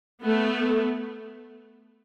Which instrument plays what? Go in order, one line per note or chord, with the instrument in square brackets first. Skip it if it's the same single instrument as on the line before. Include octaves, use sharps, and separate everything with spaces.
[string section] A3 B3